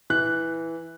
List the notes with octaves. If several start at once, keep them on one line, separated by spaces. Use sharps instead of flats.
E3 F#6